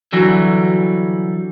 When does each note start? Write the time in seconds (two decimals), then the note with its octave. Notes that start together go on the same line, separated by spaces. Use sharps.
0.13 D3 E3 F#3 G3